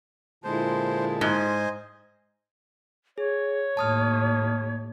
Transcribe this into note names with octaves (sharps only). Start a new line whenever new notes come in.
A#2 D3 G#3 E4 C5 A5
G#2 C5 D#5 G#5
G#4 C#5
D#2 A2 A5 D#6 F6